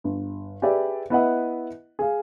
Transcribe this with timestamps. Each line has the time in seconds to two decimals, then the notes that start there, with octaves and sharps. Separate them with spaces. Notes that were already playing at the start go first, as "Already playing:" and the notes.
0.04 G1
0.62 G4 G#4 B4 D5 E5
1.10 B3 E4 B4 D#5 E5 F#5
1.99 G#4 F5